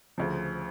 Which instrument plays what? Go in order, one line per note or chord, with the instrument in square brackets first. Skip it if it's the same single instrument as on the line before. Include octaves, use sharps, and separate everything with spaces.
[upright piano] D2 C#3 F3